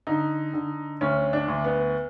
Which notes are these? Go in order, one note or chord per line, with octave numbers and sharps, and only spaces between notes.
D3 D#4
D3
D2 C#4
D4
D2
B3